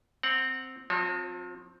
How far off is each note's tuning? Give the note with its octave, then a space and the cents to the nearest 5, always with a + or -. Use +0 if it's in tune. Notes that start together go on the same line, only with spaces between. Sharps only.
C4 +0 F#5 +0 A#5 +0
F3 +35 C4 +0 C#5 -40